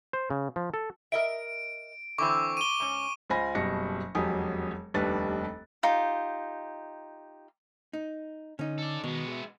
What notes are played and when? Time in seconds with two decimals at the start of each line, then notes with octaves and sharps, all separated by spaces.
0.13 C5
0.30 C#3
0.56 F3
0.74 A4
1.12 A#4 D#5 E5 D7
2.18 D3 E3 C4 C#6 D6
2.57 D#7 G7
2.80 G#2 C#4
3.30 C#2 F4 C5 G#5 B5 A#6
3.55 F#1 B2 G3 A#6 C#7
4.15 E1 F2 F#3 G4 G#5 D#6
4.94 F1 D#2 G3 D4 B4 A6
5.83 D#4 F4 G4
7.93 D#4
8.59 D3 C#4 D#4
8.78 A4 D5
9.04 B2 D#3 G#3 B3 A#5
9.28 G#4 E5